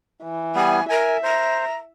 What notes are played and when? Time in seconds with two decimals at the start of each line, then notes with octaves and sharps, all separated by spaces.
0.23 E3
0.55 G3 B3 G#5
0.89 A#4 E5 G#5
1.23 C5 A#5